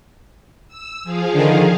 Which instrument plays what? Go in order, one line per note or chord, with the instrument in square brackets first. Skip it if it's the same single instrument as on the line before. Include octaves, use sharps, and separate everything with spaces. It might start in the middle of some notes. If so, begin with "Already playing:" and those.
[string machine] E6
F3 G#4 F5
[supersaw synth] D3 D#3